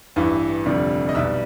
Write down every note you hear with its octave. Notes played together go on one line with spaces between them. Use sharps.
A1 G2 E3
F1 F2 D3 G3
D#5
B1 B2 G3 E5